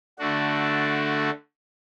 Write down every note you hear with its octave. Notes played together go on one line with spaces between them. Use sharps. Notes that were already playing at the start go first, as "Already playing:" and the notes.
D3 A3 D4 F#4